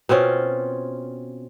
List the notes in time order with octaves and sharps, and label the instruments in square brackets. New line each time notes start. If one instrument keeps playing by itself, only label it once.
[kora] B2 C4 C#4 F4